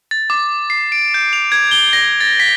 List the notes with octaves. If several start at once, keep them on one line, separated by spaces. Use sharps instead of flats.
A6
D6
C7
D7
G6
F7
G#6
G7
A#6
A6
B6